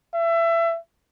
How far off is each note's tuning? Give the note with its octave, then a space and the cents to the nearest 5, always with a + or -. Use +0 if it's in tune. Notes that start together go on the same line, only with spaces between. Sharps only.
E5 +25